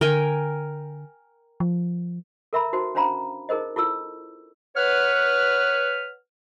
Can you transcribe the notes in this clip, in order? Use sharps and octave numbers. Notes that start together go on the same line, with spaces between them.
D3 A#4 G5 G#5
F3
A4 A#4 E5 A#5 B5
D#4 F#4 C5
C#4 D4 C5 F5 A#5 B5
D#4 G#4 A#4 C5 D#5
E4 F4 A4 E6
B4 C#5 F#5 F6